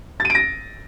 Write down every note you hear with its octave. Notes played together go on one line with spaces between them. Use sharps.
A6
D#7
D7
A#6